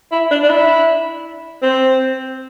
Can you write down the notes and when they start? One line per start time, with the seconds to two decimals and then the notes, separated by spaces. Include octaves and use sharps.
0.12 E4
0.31 D4
0.43 D4
0.49 E4
1.62 C4